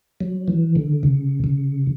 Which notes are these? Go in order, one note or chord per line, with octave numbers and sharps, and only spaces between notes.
F#3
E3
D3
C#3
C#3